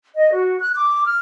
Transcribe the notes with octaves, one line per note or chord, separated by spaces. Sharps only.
D#5
F#4
F#6
D6
F6